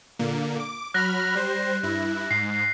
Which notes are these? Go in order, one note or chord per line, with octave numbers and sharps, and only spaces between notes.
A#2 D3 A#3
D6
F#3 B5 F6 F#6 A#6
G3 C5
G2 E4
G#2 C7